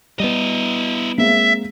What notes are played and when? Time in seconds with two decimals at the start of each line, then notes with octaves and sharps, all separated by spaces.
0.20 G3 B3 E4 D#5
1.18 G#3 A#3 C4 E5